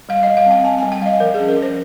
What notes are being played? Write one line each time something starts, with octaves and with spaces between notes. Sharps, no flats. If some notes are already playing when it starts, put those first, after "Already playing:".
G3 F5
D#5
G3
F5
C4 G5
C4 G#5
G#5
G3
G5
G3 D#5 F5
F3 A#4
G#4
C#4
A#4
F3
C5